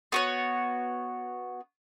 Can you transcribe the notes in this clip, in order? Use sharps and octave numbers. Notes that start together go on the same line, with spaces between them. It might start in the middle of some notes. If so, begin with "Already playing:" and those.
B3 F#4 C#5